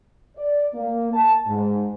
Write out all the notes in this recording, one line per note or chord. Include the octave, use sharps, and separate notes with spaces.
D5
A#3
A5
G#2